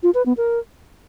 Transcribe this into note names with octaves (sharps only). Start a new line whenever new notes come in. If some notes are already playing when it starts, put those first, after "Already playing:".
F4
B4
B3
A#4